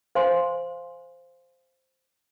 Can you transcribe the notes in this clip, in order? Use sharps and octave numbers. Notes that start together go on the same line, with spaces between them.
C5 F5 G#5 C6